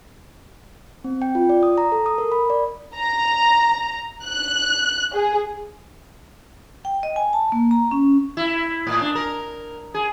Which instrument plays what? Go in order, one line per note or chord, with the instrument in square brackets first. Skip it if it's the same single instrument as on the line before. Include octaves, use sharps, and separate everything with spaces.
[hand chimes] C4
G5
F4
D5
D#6
A#5
A4
D#6
A#4
B5
D5
[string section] A#5
F#6
G#4
[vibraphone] G5
D#5
G#5
A5
A#3
A#5
C#4
[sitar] E4
A2
D4
A#4
G#4